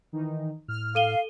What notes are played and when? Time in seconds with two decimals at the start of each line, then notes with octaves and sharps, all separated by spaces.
0.12 D#3 E3 D#4
0.68 A2 F6
0.95 A4 F5 D#7 G7